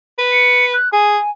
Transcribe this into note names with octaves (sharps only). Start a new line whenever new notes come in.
B4
C#7
F#6
G#4 G#5